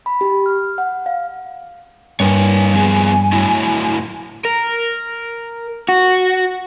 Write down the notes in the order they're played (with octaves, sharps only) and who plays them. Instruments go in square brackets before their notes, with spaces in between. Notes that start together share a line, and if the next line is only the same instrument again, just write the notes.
[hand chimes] B5
G4
F6
F#5
F5
[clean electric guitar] G2 [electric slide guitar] A#3 A#4 C#5 [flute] G#5
[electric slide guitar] F3 B3 G#4
A2 F#3 E4
[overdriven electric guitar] A#4
F#4